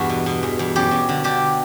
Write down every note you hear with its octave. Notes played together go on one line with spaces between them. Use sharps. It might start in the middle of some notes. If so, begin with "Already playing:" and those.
Already playing: E2 G2 F#4
B2
B2
E2
E2
F#2 G4
F#2
D3
D3 G4